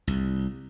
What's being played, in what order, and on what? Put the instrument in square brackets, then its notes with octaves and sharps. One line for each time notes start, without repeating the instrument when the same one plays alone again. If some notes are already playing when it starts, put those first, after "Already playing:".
[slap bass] C2